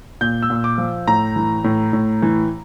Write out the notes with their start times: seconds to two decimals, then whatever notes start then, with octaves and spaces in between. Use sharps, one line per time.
0.21 A#2 G6
0.42 E6
0.50 A#2
0.64 D6
0.78 F3
1.07 A2 A#5
1.36 E3
1.64 A2
1.93 A2
2.22 E3